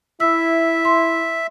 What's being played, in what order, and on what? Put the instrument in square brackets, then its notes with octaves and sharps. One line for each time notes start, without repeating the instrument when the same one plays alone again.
[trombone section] E4 [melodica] E5 [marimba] E6
[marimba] C6